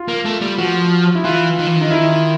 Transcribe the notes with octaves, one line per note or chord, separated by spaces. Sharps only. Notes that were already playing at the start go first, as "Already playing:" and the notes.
Already playing: F4
A#3
A3
G3
F3 F#4
E4
E3 F4
D#3
E3
D#3
D#4
E4